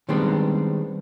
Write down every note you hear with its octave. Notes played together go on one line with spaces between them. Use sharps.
D#3 G3 G#3 B3 C4 D4